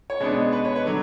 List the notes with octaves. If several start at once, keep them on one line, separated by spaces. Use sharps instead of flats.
C#5
B2 G#3 B3 D4
B4
C#5
B4
D3 F#3